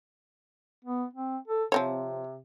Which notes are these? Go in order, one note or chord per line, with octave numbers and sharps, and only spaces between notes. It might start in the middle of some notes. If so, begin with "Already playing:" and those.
B3
C4
A4
C3 F3 C4 C#5